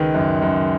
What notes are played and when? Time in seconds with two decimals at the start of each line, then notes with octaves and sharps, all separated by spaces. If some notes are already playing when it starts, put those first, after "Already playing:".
Already playing: C#2 D#3 B4
0.14 F#2
0.42 F#2